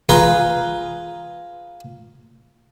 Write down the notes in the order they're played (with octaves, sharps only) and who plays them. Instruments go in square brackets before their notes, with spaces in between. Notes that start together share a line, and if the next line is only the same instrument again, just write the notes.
[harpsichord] F4 G#4 B4 A#5